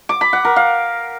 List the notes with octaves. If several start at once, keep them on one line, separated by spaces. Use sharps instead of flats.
D6
B5
F#5
A#4
F5